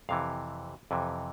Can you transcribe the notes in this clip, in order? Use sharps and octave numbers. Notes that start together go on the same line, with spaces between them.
F2 C3 E3 F5
F2 C3 E3